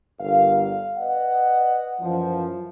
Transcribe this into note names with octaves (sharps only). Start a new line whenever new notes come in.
G1 A#4 F5
B4 D5 D#5 F#5
F#2 E3 F3